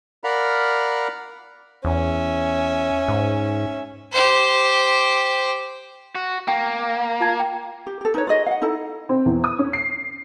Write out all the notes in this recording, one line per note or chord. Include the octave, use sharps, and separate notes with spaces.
A#4 D5 F5 F#5 A#5 B5
E2 C#4 E5
G#2
G4 C5
F#4
A#3 G5
F4 A5 G#6
G5
G4
G4 A4
D#4 B4 C#5
F4 F#4 G#4 D#5
F5 F#5
D#4 E4 A4 A5
C4
E2
D#6
C#4
C7